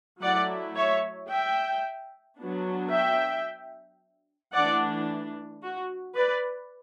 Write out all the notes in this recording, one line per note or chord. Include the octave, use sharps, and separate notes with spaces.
F#3 A3 E4 D5 F#5
C#5 E5
E5 G5
F#3 B3 D4
E5 G5
E3 A3 D4 D5 F#5
F#4
B4 D5